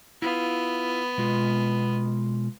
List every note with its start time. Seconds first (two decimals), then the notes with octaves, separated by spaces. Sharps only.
0.22 B3 E4 F4 F5
1.18 B2 G#3 F4